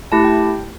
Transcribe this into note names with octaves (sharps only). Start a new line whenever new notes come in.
A3 E4 G4 A5
G5